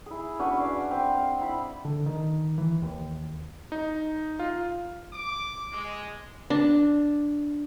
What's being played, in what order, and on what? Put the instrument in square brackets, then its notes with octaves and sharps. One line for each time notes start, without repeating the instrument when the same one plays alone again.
[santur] E4 G#4
C#4 D4 F#4 B4
D5 F5
C4
F5
E4 B5
[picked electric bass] D3
D#3
E3
D#2
[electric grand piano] D#4
F4
[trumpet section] D6
G#3
[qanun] D4